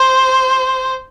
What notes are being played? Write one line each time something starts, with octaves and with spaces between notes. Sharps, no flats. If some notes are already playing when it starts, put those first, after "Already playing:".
Already playing: C5